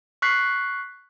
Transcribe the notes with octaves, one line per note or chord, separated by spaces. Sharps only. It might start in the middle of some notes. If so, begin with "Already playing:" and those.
C#6 F6 F#6 B6 C7